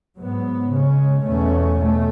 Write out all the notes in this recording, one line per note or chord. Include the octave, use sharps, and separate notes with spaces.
G#2 F#3 B3
C#3 G#3 C#4
E2 B2 A3 C#4
B2 A3